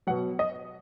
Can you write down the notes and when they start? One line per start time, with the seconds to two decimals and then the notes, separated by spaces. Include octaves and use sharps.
0.07 B2 F#3 F#5
0.39 D#5